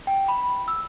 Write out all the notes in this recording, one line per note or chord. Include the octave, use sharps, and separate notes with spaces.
G5
B5
E6